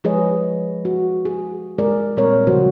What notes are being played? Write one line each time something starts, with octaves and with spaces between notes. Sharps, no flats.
F3 G#3 G#4 B4 C#5 D#5
F#4
G#4
G#3 G#4 A#4 D5
A#2 G3 C4 A#4 C#5
C#3 F3 G3 F#4 C5